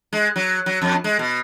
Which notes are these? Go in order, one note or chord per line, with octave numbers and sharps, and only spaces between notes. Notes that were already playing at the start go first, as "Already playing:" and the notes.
G#3
F#3
F#3
F2
G#3
B2